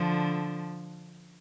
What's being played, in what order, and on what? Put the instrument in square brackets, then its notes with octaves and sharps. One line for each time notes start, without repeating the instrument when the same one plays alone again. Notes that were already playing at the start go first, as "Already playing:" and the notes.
Already playing: [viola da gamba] D3 F3